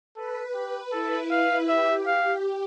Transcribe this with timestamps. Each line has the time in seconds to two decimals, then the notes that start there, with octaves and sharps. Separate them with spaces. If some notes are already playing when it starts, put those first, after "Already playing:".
0.15 A4 B4
0.54 G4
0.92 E4 A4
1.30 F5
1.68 G4 E5
2.07 F5